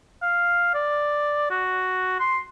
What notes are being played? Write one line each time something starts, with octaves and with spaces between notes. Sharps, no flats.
F5
D5
F#4
C6